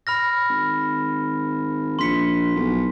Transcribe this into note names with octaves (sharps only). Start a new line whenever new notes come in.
B5 F6 A#6
G#1
A#1 C6 B6 C#7
B1